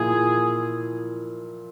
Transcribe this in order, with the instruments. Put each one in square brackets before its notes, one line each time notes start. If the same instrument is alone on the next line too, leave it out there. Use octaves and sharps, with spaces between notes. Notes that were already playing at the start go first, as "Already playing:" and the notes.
Already playing: [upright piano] A#2 F3 A#3 E4 [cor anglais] G#4